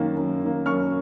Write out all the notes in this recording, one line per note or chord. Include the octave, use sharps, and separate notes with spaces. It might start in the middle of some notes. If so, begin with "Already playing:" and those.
Already playing: F#2 D#3 A#3
F#2
D#3 A#3
F#2 C#6 F6